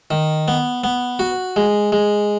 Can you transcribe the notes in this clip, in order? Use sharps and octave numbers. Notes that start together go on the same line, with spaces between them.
D#3
B3
B3
F#4
G#3
G#3